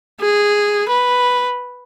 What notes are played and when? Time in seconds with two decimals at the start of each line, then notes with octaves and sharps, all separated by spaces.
0.20 G#4
0.88 B4